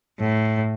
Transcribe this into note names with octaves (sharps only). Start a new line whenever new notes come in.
A2